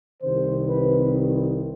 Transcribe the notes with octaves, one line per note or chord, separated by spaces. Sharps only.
C2 C3 D#3 C5
B4